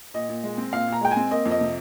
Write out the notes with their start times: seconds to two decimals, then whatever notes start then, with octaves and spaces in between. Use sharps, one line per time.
0.14 A#2 D#5
0.29 A#2
0.43 G#3
0.58 C4
0.73 A#2 F5
0.88 A#2 A#5
1.01 G#3 G5
1.11 G#5
1.16 C4
1.31 A#3 D#5
1.46 F2
1.51 D#5
1.61 C3